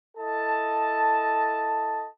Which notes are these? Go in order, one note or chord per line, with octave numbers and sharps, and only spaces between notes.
E4 A4 D#5 A5